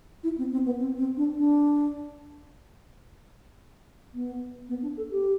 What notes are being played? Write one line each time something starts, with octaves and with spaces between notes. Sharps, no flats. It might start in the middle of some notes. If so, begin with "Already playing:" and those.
E4
C4
C4
B3
C4
C4
D4
D4
B3
B3
D4
A4
G4